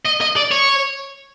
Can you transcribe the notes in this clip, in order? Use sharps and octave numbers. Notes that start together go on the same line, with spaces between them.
D#5
D#5
D5
C#5